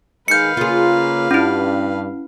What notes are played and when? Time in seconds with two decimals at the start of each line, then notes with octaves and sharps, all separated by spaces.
0.28 D#3 G#3 B4 F5 G6 C#7
0.57 C#3 A#3 F4 G#4
1.31 G2 C#4 E4